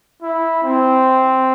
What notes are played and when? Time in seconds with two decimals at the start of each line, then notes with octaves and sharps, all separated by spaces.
0.22 E4
0.63 C4